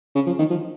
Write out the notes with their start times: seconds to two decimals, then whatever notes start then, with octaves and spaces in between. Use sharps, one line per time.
0.15 C#3
0.26 F3
0.39 D#3
0.50 F3